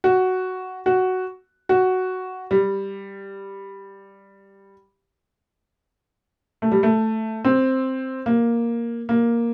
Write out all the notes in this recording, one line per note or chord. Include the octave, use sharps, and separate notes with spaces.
F#4
F#4
F#4
G3
A3
G3
A3
C4
A#3
A#3